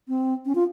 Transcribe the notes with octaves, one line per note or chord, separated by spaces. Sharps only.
C4
C#4
F4